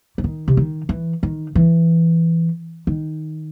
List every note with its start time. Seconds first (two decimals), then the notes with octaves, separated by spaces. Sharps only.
0.18 E3
0.24 D#3
0.48 C3
0.57 D#3
0.89 E3
1.23 D#3
1.55 E3
2.87 D#3